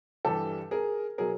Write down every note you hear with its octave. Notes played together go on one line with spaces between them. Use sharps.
G2 E3 G3 G4 A4
G#4 A#4
B2 F#3 G#4 A#4